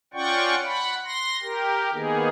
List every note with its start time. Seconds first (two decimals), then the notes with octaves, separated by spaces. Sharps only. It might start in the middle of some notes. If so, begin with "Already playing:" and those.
0.14 C#4 F4 D5 F#5 G5 C#6
0.64 F#5 B5
1.05 C6 A#6
1.42 G4 A#4
1.93 D#3 A#3 B3 D#4 G#4